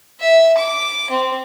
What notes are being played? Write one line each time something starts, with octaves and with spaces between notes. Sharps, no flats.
E5
D6
C4